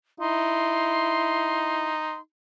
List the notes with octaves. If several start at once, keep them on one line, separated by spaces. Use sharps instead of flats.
D#4 E4 C6